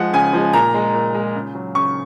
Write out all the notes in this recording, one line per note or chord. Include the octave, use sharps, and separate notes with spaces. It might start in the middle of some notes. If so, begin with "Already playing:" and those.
Already playing: F3 G#3 F#5
C#3 G#5
F3 G#3
A#2 A#5
G#3
A#2
G#3
C#3
F#3
C#3 C#6